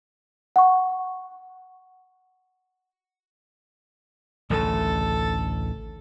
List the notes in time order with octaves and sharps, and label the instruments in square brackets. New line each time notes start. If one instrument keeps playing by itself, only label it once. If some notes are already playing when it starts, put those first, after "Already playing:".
[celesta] F#5 C#6
[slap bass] A1 D2 C#3 [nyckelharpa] A4